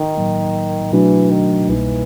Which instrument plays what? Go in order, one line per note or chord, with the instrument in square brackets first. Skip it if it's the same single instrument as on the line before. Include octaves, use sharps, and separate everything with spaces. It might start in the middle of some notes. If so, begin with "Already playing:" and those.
Already playing: [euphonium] D#3
[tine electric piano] A2 F#3 A#3 D#4
[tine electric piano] B2 F#3 A3 D4 F#4 [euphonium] E3
[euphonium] D#3
[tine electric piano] C2 B2 G3 A#3 D#4 [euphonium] E3